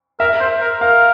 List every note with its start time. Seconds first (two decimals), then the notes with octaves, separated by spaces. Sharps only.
0.20 A#4 E5
0.40 C5
0.61 A#4
0.81 A#4 F5